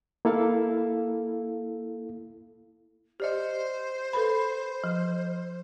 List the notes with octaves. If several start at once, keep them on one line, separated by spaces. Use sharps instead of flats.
A#3 E4 A4 F5
G4 C5 D5 D#5
A4 B4 B5
F3